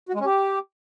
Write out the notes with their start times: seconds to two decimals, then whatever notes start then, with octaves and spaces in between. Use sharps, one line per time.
0.09 F#4
0.14 G#3
0.20 C#4
0.26 G4